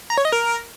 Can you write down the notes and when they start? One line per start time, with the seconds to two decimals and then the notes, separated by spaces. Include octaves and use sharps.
0.10 A#5
0.17 C#5
0.25 D#5
0.32 A#4